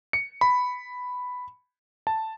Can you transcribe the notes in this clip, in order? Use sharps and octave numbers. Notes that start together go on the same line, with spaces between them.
C#7
B5
A5